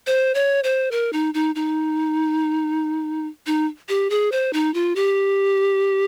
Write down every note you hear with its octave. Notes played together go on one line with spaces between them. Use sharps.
C5
C#5
C5
A#4
D#4
D#4
D#4
D#4
G4
G#4
C5
D#4
F4
G4